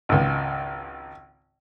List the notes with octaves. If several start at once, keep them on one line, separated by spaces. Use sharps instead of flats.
G#1 C#2